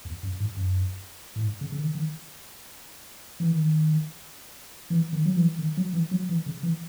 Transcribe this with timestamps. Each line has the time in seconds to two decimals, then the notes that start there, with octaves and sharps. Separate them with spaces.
0.05 E2
0.23 F#2
0.40 G#2
0.57 F#2
1.36 A2
1.44 G#2
1.61 C#3
1.72 C#3
1.78 D#3
1.95 D#3
3.40 E3
3.51 D#3
4.90 E3
5.13 D#3
5.26 F#3
5.37 E3
5.59 D#3
5.77 F#3
5.93 E3
6.11 F#3
6.29 E3
6.46 C#3
6.63 E3